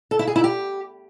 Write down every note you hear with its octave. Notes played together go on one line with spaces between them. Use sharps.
A4
E4
G#4
E4
G4